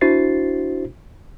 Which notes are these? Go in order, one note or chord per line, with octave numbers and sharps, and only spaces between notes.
D4 E4 F#4 C5 A6 C7